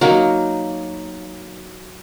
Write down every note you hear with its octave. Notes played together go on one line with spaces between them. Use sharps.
F#3 A#3 D#4